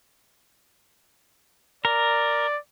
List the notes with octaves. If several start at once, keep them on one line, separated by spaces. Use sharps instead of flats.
A#4 D5